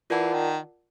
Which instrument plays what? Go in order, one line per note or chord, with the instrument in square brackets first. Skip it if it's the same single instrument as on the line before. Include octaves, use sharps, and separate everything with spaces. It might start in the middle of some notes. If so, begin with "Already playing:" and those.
[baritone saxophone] E3 [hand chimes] F4 A#4 D5 F#5 A5
[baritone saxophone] D#3